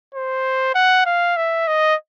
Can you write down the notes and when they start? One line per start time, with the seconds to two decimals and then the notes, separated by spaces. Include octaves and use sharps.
0.15 C5
0.75 F#5
1.06 F5
1.36 E5
1.67 D#5